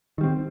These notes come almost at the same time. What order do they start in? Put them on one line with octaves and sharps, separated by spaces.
D#3 G3 C4